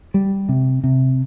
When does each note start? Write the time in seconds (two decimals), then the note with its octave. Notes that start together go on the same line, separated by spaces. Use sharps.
0.14 G3
0.49 C3
0.84 C3